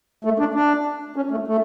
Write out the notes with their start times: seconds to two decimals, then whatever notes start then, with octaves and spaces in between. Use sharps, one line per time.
0.25 A3
0.39 D4
0.55 D4
1.16 C#4
1.31 A3
1.48 A3